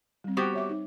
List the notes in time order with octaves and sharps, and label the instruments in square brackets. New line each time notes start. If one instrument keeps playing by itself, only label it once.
[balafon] G3 C4
[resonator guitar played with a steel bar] B3 F#4 G4 [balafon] C5 G5
[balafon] C#5 E5 D6
D#4